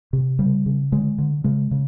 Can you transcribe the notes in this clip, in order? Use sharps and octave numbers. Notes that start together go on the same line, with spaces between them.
C3
C#3 G3
C#3
D3 G#3
D3
C#3 G#3
C#3